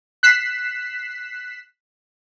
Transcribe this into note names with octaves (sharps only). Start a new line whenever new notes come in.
F#6 B6 C7 E7